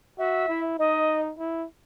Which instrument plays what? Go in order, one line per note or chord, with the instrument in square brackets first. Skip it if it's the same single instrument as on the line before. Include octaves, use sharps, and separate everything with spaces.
[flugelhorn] F#4 [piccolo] E5
[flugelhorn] E4
[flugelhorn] D#4 [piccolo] D#5
[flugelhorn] E4